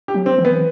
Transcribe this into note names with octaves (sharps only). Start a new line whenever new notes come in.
G4
F#3
C4
E3
B3